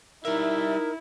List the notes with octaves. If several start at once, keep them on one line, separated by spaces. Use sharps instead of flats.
G3 D#4 E4 A#4 E5